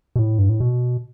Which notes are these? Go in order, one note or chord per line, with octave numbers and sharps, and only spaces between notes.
B2
A2
G2
A2
B2